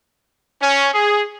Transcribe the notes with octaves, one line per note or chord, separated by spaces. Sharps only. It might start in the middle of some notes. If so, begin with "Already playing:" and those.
C#4
G#4